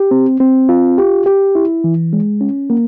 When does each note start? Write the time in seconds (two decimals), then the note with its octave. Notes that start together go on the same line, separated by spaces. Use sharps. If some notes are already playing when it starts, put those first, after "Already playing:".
Already playing: G4
0.11 C4
0.40 C4
0.69 F4
0.98 G4
1.26 G4
1.55 E4
1.84 E3
2.13 G#3
2.41 C#4
2.70 A#3